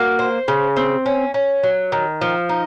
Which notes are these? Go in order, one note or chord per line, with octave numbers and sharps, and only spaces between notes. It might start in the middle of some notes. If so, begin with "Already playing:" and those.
Already playing: A#3 F#4
C5
C#3
C4
C#4
C#4
F#3
D#3
F3
D#4